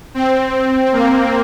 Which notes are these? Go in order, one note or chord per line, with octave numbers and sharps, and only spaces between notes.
C4
A#3